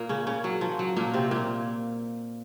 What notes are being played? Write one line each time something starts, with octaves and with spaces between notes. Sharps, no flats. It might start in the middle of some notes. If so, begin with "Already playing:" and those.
Already playing: A#2 A#3
C#3 C#4
C#3 C#4
F#3
F3
F#3
A#2 A#3
C3 C4
A#2 A#3